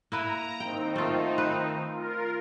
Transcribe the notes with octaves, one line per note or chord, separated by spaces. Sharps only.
A#3 E4 B4 A#5
D#3 C4 D#4 G5
A3 F4
B4
F4 A#4